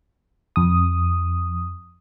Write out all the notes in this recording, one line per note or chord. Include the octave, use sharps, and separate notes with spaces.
F2 D#6